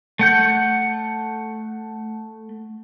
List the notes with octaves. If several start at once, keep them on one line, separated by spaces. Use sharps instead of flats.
A3 F#5 G6